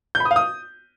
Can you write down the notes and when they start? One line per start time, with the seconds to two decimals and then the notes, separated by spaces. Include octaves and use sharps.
0.15 G6
0.20 B5
0.25 D#6
0.31 F5
0.36 D#6